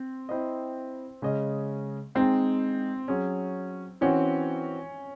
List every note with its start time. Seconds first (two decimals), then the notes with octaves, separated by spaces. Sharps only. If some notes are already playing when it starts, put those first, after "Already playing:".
Already playing: C4
0.29 C4 E4 C5 D#5
1.22 C#3 G#3 C#4 G#4 D#5
2.15 G#3 C4 D#4 G#4 C5
3.08 F#3 C#4 G#4
4.01 E3 C4 C#4 F#4